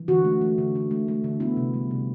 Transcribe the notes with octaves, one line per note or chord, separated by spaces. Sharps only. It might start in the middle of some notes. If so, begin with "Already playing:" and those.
Already playing: E3
D3 F#4
A3
A3
D3
D3
A3
A3
D3
B3 E4
C3
G3
C3